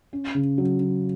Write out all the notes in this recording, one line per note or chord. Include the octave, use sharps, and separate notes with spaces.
C#4
C#3
F#3
F#3